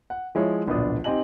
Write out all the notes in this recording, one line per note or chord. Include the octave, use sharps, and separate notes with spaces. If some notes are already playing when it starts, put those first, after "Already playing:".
F#5
F3 G#3 E4 C#5
D1 A#1 B2 D4 D#6
C4 D#4 G4 D#5 G#5 F#7